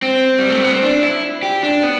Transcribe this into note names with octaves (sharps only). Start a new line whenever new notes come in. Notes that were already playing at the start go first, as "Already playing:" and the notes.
C4
G3
A3
B3
C4
D4
E4
G4
D4
B3